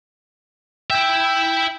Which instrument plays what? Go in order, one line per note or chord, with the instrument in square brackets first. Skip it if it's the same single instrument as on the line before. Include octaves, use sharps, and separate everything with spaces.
[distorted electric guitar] E4 E5 [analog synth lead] G5